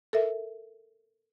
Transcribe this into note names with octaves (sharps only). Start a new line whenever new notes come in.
A4 A#4 E5